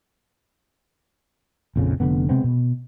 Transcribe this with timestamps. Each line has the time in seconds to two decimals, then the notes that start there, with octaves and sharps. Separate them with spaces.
1.76 A#1 F2 C#3
2.00 F1 D3 B3
2.29 C3 G#3 B3 C4
2.44 B2